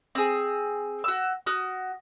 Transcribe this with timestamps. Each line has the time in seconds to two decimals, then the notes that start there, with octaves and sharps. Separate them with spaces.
0.15 C4 G#4
1.04 F#4 E6
1.46 F#4 D#6 F6